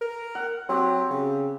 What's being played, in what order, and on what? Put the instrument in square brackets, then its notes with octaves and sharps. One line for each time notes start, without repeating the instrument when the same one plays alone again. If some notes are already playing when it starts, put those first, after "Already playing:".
[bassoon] A#4
[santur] F#5
[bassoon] F#3 [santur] C4 G4
[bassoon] C#3